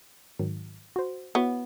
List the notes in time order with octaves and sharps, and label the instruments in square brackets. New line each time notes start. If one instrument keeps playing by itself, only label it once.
[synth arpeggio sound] G#2 D#3 F#3
F#4 C5
[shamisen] B3 [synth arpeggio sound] E4 F#4 C#5